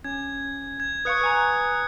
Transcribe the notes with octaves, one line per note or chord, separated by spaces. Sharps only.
C#4 G#6
G#6
B4 F5 C#6 D#6 F#6 C#7
B4 G#5 A#5 C#7